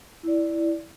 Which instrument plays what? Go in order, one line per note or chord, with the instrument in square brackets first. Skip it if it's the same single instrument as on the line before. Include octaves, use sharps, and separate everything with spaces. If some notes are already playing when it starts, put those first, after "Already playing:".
[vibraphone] E4 D5